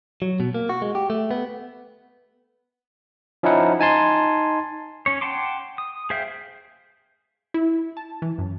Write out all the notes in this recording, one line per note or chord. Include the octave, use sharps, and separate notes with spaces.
F#3
B2
A#3
F#4
G#3
G4
A3
B3
F3 C#4 D#4 E4 F#5
D#4 G#5 A5 C6
C#4 C#5
F#5 G5 A5 C6 D6
D#6
G#4 C5 E5 F5 G5
E4
A5
E3
F#2